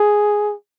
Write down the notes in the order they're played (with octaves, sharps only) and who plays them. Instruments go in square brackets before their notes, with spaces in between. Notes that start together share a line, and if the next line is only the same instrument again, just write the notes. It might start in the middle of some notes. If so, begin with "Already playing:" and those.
Already playing: [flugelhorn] G#4